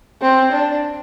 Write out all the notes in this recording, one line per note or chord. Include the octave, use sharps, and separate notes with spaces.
C4
D4